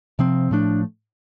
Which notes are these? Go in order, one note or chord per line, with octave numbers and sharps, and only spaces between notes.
C3 F3 C4
A2 F3 A3 D4